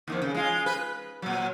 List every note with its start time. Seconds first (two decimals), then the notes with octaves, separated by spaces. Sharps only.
0.08 D#2 D#3 F3
0.22 C#3
0.34 G#3 F4
0.66 B4
1.22 A#2 F#3